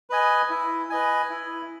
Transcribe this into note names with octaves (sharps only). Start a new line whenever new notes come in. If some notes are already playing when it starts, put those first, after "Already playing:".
B4 D#5 G#5
E4
B4 D#5 G#5
E4